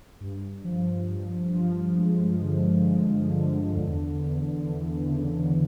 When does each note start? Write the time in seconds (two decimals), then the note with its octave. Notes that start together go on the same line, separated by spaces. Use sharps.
0.20 G2
0.64 F3
1.09 G2
1.53 F3
1.98 G#3
2.42 D3
2.87 G#3
3.31 D3
3.76 E2
4.20 E2
4.65 E3
5.09 C#3